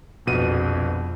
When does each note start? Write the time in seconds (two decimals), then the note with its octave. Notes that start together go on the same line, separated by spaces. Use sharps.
0.27 A#1 F2 B2 D#7